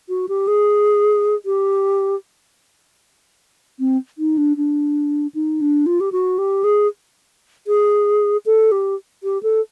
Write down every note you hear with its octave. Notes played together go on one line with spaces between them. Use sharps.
F#4
G4
G#4
G4
C4
D#4
D4
D4
D#4
D4
F4
G4
F#4
G4
G#4
G#4
A4
G4
G4
A4